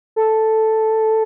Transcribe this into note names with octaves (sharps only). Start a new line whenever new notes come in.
A4